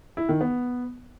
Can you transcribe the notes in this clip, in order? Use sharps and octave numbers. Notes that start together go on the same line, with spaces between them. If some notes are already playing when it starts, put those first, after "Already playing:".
E4
D#3
B3